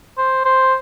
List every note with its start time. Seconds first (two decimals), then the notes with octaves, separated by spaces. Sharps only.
0.18 C5
0.45 C5